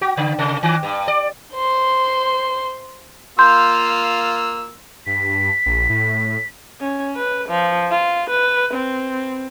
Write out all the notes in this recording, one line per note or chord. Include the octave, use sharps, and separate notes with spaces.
F#4
C#3
C3
D#3
G2
D5
C5 C6
A#3 F4 C6 E6 G6
G2 B6
A#1
A2
C#4
B4
F3
F4
B4
C4